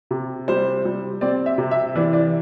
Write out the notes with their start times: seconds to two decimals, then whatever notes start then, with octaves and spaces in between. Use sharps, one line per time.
0.11 C3
0.48 G3 C5
0.85 G3
1.21 C4 D5
1.46 E5
1.58 C3
1.71 E5
1.95 E3 D5
2.13 D5